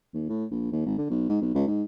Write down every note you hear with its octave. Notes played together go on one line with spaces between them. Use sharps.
D#2
A2
A#1
D#2
G#1
D3
B1
G#2
B1
C#2
G#2